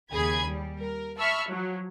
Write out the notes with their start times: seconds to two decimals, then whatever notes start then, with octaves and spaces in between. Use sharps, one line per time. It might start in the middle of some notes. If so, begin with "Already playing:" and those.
0.12 D#2 C#3 G#4 B5 G#6
0.47 G3
0.82 A#4
1.19 E5 A5 B5 C#6 E6 F6
1.50 F3 F#3